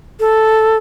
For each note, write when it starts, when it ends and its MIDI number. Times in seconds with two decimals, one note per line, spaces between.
0.20 0.77 69